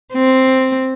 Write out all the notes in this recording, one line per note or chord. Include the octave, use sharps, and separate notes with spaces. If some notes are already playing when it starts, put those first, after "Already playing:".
C4